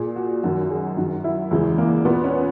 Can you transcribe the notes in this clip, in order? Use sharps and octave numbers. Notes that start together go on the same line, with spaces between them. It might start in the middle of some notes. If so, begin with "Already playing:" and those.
Already playing: A#2 G#4
F#4
F#2 D#3 F#4
G#4
F#2 D#3 F#4
E4
E2 C#3 E3 G#3
A#3
A#2 B3
C#4